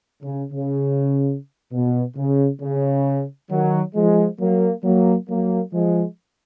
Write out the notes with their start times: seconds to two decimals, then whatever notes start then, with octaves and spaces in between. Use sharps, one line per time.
0.23 C#3
0.52 C#3
1.72 B2
2.17 C#3
2.61 C#3
3.51 D#3 F#3
3.95 F3 G#3
4.40 F#3 A#3
4.84 F#3 A#3
5.29 F#3 A#3
5.74 F3 G#3